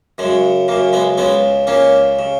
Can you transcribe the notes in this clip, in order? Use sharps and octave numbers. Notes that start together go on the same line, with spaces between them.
F#2 C#3 G#3
F#2 C#3 A#3
G#3 B3
C#2 C#3 G#3 B3
C#2 C#3 A#3 C#4
C#3